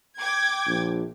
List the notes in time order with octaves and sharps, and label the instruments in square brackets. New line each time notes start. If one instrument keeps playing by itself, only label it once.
[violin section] G5 D6 G#6
[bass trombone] A#1